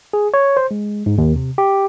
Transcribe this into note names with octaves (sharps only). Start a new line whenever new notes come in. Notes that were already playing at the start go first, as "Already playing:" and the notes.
G#4
C#5
C5
G#3
G#2
D#2
C3
G4